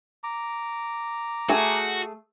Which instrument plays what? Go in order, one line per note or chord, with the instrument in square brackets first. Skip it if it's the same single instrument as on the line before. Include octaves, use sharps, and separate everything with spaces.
[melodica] A#5 D6
[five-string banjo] A3 G#4 [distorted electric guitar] F#4